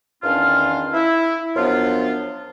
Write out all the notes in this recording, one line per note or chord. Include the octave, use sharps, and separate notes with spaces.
E2 D#3 C#4 D4 F4 F5
E4
F#2 F3 B3 D4 F4